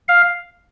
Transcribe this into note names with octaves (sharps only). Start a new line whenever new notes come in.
F5